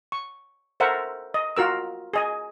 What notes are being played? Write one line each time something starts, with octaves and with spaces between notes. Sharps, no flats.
C#6
A4 A#4 C5 E5 F#5
D#5
F4 F#4 A#4 E6
G#4 D#5 G#5